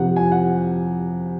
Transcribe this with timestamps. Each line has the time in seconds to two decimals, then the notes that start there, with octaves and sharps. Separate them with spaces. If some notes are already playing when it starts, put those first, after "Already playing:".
Already playing: F2 C3 F3 F#5
0.16 G#5
0.32 F#5